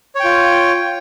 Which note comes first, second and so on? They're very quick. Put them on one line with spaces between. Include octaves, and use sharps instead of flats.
C#5 G5 F4